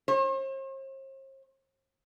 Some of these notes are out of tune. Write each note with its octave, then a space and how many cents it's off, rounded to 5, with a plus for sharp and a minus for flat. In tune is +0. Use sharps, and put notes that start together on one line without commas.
C5 +45